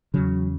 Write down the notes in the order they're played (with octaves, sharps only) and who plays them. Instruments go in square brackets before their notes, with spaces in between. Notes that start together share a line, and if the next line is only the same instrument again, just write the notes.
[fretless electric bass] E2 C#3 F#3